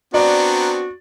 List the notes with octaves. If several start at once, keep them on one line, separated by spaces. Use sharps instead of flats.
B3 C4 D4 F#4 D5 A#5